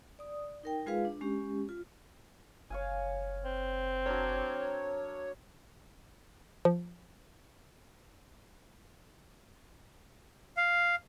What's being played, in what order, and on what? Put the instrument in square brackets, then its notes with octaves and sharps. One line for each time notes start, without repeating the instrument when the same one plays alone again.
[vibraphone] D5 D#6
D#4 A#4 G5
G#3 F4 G#4 B4 F5
D4
G#3 C#4 G4
F4
[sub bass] F#1 [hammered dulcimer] C#5 F5 G#5
[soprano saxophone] C4
[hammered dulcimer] F#3 D4 A#4 [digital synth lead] C#5
[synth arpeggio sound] F3
[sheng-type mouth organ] F5